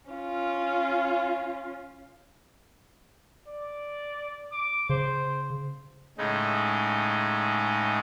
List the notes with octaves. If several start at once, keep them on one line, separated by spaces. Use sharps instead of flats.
C#4 F4
D5
D6
C#3 C5
A2 C#3 G#3 D#4